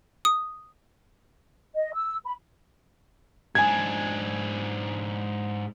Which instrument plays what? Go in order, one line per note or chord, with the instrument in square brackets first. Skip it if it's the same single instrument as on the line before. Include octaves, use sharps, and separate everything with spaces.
[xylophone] D#6
[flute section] D#5
E6
B5
[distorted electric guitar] G#2 D4 [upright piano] G#5 G#6